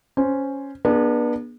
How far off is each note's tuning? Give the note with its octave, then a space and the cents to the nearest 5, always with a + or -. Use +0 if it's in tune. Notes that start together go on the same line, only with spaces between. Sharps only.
C#4 +0 C5 +0
B3 -35 D4 +25 G#4 +0